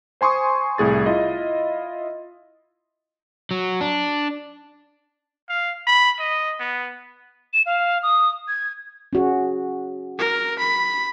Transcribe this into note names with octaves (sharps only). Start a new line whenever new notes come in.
C5 G#5 C6 C#6 D#6
C2 A2 G#4 A6
E4 F4 D#5
F#3
D4
F5
B5
D#5
B3
E7
F5
D#6
G#6
C#4 F#4 G#4
A#4
B5